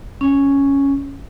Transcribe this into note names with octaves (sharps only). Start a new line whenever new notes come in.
C#4